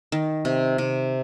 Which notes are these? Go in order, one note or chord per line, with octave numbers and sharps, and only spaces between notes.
D#3
C3
C3